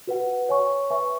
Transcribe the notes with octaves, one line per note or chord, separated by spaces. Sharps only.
F#4 B4 F#5
C#5 G#5 C#6
B4 E5 G#5 C#6